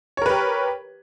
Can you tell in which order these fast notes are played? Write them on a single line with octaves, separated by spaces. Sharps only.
C#5 A#4 B4 G4